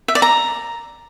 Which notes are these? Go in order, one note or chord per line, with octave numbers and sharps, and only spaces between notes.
E5
D5
A#5